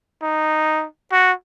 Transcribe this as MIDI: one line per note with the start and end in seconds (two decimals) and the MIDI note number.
0.22 0.85 63
1.12 1.32 66